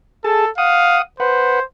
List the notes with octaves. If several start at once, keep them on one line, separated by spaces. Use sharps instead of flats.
G#4 A4 A5
F5 F#5 D#6
B4 C5 F#5